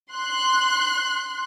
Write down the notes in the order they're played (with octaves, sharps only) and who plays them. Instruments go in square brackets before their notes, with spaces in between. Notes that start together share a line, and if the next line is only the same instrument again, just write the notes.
[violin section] C6 F#6